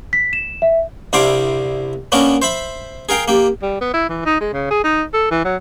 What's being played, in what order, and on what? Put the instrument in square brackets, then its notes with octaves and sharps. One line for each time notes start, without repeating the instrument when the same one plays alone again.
[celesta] B6
E7
E5
[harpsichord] C2 D4 E4 C5 F5 D6
A#3 B3 C#4 D4 A#4
C5 E5 B5
G#4 A#4 F5 G5
A#3 G4
[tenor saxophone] G3
B3
E4
E3
D#4
G#3
C#3
G#4
D#4
A4
E3
F#3